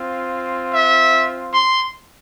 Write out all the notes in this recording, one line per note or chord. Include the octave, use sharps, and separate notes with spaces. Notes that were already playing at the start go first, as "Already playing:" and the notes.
Already playing: C4 F4
E5
C6